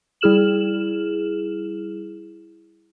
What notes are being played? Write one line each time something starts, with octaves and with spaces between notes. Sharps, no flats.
G3 E4 G#4 F6 E7 F#7